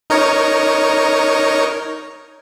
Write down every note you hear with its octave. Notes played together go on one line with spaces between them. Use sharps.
D#4 A#4 C#5